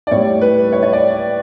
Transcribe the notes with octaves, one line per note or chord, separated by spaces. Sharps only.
D5
A2 G3 C#5
B4
C#5
C#5
D5